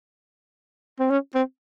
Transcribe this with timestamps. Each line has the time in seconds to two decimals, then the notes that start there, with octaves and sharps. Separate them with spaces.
1.00 C4
1.10 C#4
1.35 C4